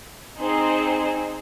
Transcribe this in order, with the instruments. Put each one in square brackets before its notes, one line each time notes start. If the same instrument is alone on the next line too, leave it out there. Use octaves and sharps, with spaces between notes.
[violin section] C4 D#4 G#4 C5